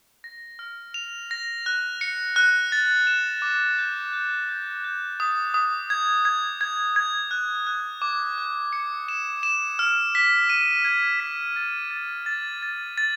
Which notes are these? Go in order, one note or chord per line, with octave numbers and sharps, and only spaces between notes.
A#6
F6
F7
A#6
F#6
C#7
F#6
A6
E7
D6
G6
G6
G6
G6
D#6
D#6
G#6
G#6
G#6
G#6
F#6
F#6
D6
F#6
C#7
E7
E7
F6
B6
D#7
G#6
B6
A6
A6
A6
A6
A6